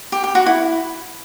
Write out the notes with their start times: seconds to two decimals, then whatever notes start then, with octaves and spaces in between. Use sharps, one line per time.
0.12 G4
0.24 G4
0.35 F#4
0.46 E4